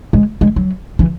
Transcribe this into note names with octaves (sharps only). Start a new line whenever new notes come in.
G#3
G#3
F#3
E3